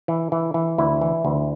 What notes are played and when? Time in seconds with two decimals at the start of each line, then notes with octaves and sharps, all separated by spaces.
0.08 E3
0.32 E3
0.54 E3
0.78 D2 E4
1.01 E3
1.25 D2